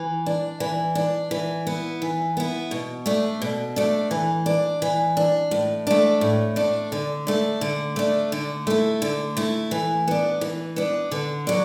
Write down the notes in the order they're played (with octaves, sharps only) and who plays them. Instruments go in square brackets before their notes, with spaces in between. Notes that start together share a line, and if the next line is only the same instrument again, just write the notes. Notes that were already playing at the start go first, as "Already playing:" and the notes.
Already playing: [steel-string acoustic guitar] E3
D4
E3
D4
E3
B3 E4
E3
B3 E4
B2
A3 D4
B2
A3 D4
E3
D4
E3
D4
A2
A3 D4
A2
A3 D4
D3
A3 D4
D3
A3 D4
D3
A3 E4
D3
A3 E4
E3
B3 D4
E3
B3 D4
D3
F#3 D4